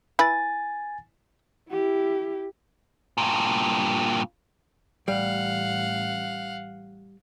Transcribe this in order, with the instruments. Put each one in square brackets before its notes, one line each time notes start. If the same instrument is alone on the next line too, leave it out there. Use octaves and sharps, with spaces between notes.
[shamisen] E4 B4 [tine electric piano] G#5 A6
[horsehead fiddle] E4 G4
[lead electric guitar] G2 A#2
[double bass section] A1 [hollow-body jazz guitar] G3 [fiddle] F5 F#5